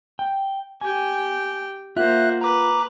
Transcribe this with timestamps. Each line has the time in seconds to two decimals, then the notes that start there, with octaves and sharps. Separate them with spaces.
0.19 G5
0.81 G4 G5 G#5
1.97 A#3 F4 C5 E5 F#5 F#6
2.41 B4 A#5 D6